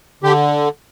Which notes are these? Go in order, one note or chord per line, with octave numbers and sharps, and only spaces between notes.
D3 G4